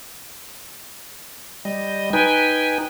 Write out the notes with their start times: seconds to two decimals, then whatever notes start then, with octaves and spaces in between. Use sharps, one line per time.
1.65 G3 D#5
2.13 D#4 B4 G5 G#5